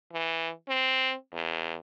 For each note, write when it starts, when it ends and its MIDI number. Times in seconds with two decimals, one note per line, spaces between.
0.13 0.51 52
0.68 1.14 60
1.33 1.76 40